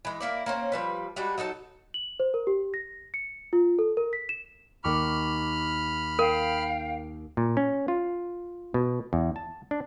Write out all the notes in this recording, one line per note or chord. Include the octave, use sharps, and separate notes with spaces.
E3 G#3
A#3 E4 D5
A#3 C4 C#4
F3 G3 B4
G3 G#3 D4 F#4
F#3 D#4 A4 A5
F#7
C5
A#4
G4
A#6
C#7
F4
A4
A#4
B6
E7
D#2 B5 C#6 D6 F6
A#4 F5 G5
A#2
C#4
F4
B2
E2
A5
D4